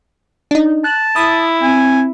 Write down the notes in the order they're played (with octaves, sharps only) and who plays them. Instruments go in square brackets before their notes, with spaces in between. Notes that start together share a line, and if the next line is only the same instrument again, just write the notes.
[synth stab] D4 D#4
[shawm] A5 [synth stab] F#6
[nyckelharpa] E4 [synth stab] D#6
[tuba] C4 [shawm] G#5